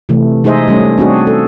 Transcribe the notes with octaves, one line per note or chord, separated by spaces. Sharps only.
C3 E3 A3
G#3 D#4 G#4 C5 D#5 E5
G3 A3 C#4
C4 D4 F#4 G#4
A4